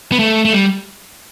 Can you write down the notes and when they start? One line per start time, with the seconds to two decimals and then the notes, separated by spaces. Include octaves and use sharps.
0.12 B3
0.19 A3
0.45 A3
0.53 G3